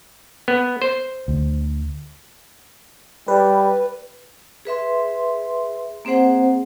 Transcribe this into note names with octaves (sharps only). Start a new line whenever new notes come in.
B3
C5
D2
G3 B4
G#4 B4 E5 C6
A#3 C4 G#4 C5 F#5